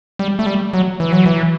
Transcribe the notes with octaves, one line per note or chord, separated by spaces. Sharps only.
G3
A3
G3
F#3
E3
F#3
E3